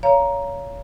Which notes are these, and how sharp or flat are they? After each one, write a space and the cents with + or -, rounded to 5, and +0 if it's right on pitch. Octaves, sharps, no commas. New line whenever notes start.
C#5 +25 F5 -15 A#5 +10